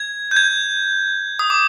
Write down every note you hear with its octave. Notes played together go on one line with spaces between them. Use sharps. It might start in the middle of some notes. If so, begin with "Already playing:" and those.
Already playing: G#6
G6
G#6
D#6
D6